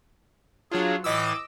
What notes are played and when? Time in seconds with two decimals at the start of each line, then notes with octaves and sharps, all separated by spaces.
0.71 F#3 D4 F4 G#4 C#5
1.04 A2 E3 D#5 D6 E6